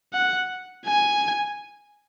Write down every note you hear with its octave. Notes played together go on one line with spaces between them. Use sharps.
F#5
G#5